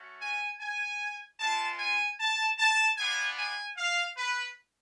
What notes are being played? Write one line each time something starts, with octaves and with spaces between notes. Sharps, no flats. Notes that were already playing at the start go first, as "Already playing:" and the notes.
Already playing: A3 C#4 F#4
G#5
G#5
G#3 B3 F4 A5
G#5
A5
A5
B3 D4 F4 G#5
G#5
F5
B4